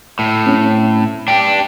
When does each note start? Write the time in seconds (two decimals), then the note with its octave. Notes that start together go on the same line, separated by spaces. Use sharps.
0.19 A2
0.46 C4 C#4
1.28 D4 G4 G5